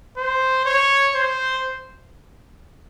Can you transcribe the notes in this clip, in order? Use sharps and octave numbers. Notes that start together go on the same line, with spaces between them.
C5
C#5
C5